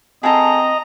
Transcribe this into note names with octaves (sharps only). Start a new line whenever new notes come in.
C4 G#4 A4 D#5 A#5